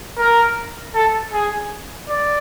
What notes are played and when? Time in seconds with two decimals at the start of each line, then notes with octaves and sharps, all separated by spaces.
0.18 A#4
0.95 A4
1.33 G#4
2.09 D5